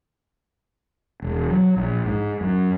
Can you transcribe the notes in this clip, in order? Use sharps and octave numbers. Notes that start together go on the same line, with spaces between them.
E1
F#3
A#1
G#2
F#2